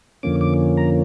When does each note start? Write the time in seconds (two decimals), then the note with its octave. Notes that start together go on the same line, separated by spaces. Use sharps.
0.23 F2 D3 F3 A#3 C#4 D6
0.41 D6
0.77 A#5